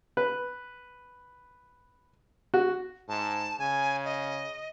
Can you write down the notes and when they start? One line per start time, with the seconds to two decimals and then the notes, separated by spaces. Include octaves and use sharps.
0.17 B4
2.54 F#4
3.09 G#2 A5
3.59 C#3 G#5
4.05 D#5